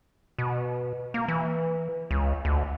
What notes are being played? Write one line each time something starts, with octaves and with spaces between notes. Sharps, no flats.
B2
A#3
E3
C#2
D2